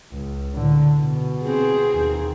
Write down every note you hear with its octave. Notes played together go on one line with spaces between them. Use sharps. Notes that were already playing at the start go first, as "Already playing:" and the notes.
C#2
A2 D3
B2
C4 G#4
D#2